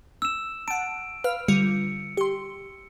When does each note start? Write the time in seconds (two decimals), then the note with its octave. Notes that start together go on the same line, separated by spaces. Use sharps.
0.22 E6 E7
0.68 F#5 A5 D7
1.24 B4 F5 F6
1.48 D3 G3 F4 C#7
2.17 G4 C6